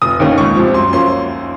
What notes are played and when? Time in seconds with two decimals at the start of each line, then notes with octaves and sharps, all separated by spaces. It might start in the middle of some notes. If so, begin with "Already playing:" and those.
0.02 F1 D#6
0.20 D#2 D#3 A#3 C#4
0.38 C#2 C#6
0.56 C3 F3
0.74 F#2 C6
0.93 F3 A#3 C#4 C6